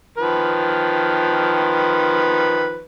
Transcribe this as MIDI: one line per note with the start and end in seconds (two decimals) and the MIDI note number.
0.18 2.84 51
0.18 2.84 53
0.18 2.84 71